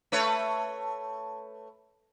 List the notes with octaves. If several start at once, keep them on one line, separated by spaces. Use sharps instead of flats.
A3 B4 C#5